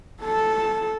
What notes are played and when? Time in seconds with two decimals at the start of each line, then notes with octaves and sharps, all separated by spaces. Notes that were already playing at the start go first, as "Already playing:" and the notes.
0.23 A4 A5